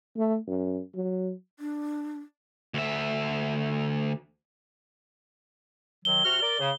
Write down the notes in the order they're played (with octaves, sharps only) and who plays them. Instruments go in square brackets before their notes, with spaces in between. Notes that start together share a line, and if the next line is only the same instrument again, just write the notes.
[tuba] A3
F#2
F#3
[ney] D4
[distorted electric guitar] D2 E5
[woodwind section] D#3 F#3 [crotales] G7
[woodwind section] C3 F#4 F6
A#4 D5
C#3